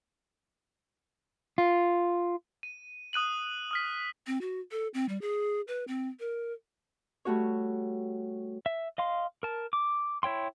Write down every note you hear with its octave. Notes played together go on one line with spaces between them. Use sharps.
F4
D#7
D#6 F#6 D#7 F#7
D#6 F6 B6
C4
F#4
A4
C4
G3
G#4
B4
C4
A#4
G3 A3 F#4 C#5
E5
D#5 F5 C6
A#4 A5
D6
E4 C#5 G5 C6